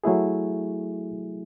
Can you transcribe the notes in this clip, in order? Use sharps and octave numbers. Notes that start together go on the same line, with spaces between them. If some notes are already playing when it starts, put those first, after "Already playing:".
F#3 A3 E4 G#4